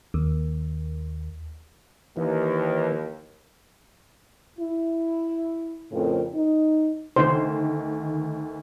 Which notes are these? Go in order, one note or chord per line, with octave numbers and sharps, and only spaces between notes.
D#2
D#2 E3
E4
F2 A2 C#3 C4 F4 A#4
D#4
D2 D#3 C5